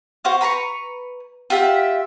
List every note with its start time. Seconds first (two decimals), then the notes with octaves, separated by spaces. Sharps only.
0.25 F#4 C5 F5
0.41 B4 A#5 C6 C#6
1.50 F4 G4 E5 F#5